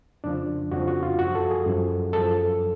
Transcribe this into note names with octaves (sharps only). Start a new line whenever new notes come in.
F2 C#3 F3 D4
F2 C#3 F3 F#4
F#4
F4
F#2 F3 F#4
A4
G#4
F#2 F3
F#2 F3 A4